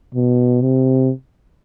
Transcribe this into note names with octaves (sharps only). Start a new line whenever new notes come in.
B2
C3